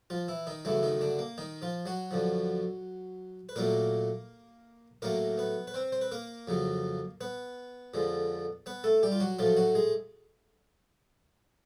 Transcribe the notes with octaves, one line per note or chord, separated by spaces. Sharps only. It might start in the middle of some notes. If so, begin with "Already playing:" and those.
F3 F4
E3 E4
D#3 D#4
F#2 C#3 E3 F#3 A3 E4
D#3 D#4
D3 D4
A#3
D#3 D#4
F3 F4
F#3 F#4
F#2 D3 F3
B4
A#2 F#3 A3 A#3 A#4
A2 F#3 A3 A#3 A#4
B3 B4
B4
C4 C5
C5
B4
A#3 A#4
F2 C#3 F#3
B3 B4
F2 D3 F3 G#3
B3 B4
A3 A4
G3 G4
F4
F#3 F#4
A2 F3 F#3 A3 F4
F#3 F#4
G#3 G#4